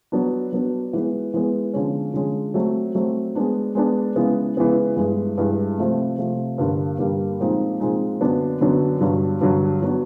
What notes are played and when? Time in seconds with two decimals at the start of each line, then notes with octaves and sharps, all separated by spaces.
0.12 F#3 B3 D4
0.52 F#3 B3 D4
0.93 E3 G#3 B3
1.34 E3 G#3 B3
1.74 D3 F3 G#3 C#4
2.14 D3 F3 G#3 C#4
2.54 F#3 A3 C4
2.95 F#3 A3 C4
3.35 G#3 B3 D4
3.75 G#3 B3 D4
4.16 C#3 E3 G#3 B3
4.57 C#3 E3 G#3 B3
4.96 G2 E3 G#3
5.38 G2 E3 G#3
5.77 C3 F3 A3 C4
6.19 C3 F3 A3 C4
6.58 G2 D3 G3 A#3
6.98 G2 D3 G3 A#3
7.40 A#2 F3 G#3 C4 D#4
7.80 A#2 F3 G#3 C4 D#4
8.21 F#2 D3 F#3 B3 D4
8.61 F#2 D3 F#3 B3 D4
9.01 G2 D3 F#3
9.41 G2 D3 F#3
9.82 F#3 B3 D4